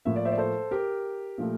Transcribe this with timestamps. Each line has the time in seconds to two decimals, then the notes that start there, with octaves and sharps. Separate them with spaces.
0.05 A2 F3 A#3 E5
0.16 D5
0.25 C5 E5
0.32 D5
0.38 A4 C5
0.71 G4 A#4
1.38 A#2 F3 A3